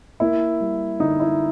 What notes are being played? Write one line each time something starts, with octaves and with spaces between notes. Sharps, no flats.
A#3 E4
G3
D3 D#4
E4